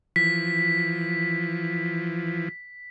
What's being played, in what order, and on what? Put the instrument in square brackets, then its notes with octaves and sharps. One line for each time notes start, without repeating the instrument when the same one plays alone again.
[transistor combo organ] E3 F3 [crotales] B6